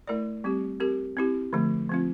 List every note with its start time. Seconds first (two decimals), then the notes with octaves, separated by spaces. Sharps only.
0.07 A3 E4 A#4 D5
0.44 G3 C4 G4
0.80 C4 G4 A#4
1.17 C4 E4 G4
1.53 D3 F3 A3
1.89 F3 C4 F4